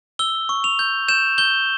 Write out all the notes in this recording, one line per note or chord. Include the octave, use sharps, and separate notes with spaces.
E6 G7
C#6
F7
G6
G6 E7
G6 G7